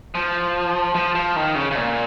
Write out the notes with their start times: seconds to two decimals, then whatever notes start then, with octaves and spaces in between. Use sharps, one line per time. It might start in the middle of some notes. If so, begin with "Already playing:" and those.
0.15 F3
0.95 F3
1.15 F3
1.36 D#3
1.55 C#3
1.71 C#3
1.76 A#2